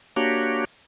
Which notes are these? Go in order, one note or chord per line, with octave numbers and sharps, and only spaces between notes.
A#3 D4 F#4 G4 C#5